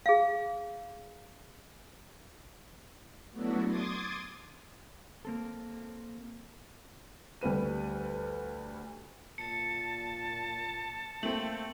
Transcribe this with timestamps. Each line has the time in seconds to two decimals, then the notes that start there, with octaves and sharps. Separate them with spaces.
0.06 G#4 F5
3.31 F#3 A3 B3 D4 E4 F#4
3.66 C6 D6 D#6 G#6 A6
5.25 A#3 C4 A4
7.41 D2 G3 B4 D#7
9.38 A#2 A5 C#7
11.23 A3 A#3 C4 F#7